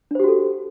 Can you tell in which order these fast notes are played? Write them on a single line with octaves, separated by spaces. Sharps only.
D4 C5 G4 F#4 A4